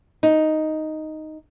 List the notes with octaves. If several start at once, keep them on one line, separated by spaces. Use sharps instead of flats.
D#4